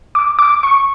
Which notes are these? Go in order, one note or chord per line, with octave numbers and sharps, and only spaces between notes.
D6
D6
C#6